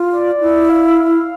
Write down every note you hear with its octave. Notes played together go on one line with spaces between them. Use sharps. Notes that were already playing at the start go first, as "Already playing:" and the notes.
Already playing: F4
D5
E4
F5